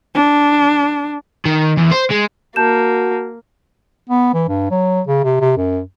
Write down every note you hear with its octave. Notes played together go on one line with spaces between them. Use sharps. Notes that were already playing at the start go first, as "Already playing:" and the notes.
D4
D#3
E2
C5
G#3
A#3 F#4 A5 G6 E7
B3
E3
G2
F#3
C#3
C3
C3
F#2